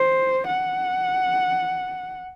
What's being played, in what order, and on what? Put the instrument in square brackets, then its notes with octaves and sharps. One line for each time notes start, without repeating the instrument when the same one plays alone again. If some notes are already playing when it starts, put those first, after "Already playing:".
Already playing: [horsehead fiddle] C5
F#5